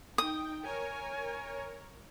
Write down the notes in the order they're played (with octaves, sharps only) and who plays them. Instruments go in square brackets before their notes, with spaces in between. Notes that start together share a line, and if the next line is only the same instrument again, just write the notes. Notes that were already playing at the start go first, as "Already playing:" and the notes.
[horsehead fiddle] D#4 [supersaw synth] G5 [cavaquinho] D#6
[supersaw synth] A#4 C#5 [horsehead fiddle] G#5